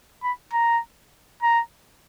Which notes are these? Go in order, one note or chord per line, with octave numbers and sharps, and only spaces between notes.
B5
A#5
A#5